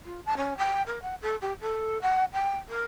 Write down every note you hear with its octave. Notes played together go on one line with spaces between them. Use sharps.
F4
A5
C#4
G5
A#4
F#5
A4
G4
A4
F#5
G5
A#4